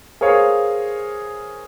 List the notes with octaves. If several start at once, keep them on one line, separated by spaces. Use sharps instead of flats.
G#4 A#4 C5 C#5 F5